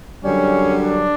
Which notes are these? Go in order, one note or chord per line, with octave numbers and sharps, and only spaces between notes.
F#2 D3 G3 C#4
D4